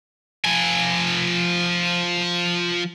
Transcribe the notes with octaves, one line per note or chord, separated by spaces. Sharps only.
F3 G#5